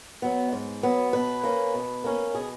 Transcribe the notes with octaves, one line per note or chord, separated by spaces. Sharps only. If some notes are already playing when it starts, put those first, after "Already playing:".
F#3 B3
G#2
F#3 B3
B2 B4
A#3 C#4
B2
A#3 C#4
B2 G#4